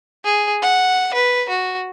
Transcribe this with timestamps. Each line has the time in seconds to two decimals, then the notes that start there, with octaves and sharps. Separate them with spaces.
0.25 G#4
0.62 F#5
1.14 B4
1.49 F#4